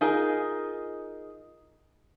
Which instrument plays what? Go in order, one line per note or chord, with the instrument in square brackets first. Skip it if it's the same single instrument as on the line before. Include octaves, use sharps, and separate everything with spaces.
[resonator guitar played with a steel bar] D#4 F4 G#4 A#4 D#5